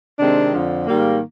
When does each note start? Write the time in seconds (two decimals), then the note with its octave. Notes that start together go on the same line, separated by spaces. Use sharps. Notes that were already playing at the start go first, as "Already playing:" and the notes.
0.19 C3 D#3 G#3 C4 D4
0.53 F2 D3 F3
0.86 G#2 D#3 G3 A#3